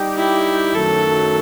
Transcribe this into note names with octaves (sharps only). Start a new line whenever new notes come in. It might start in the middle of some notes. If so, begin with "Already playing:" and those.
Already playing: G3 D#4 G4
E4
F#2 D#3 F#3 A3 A4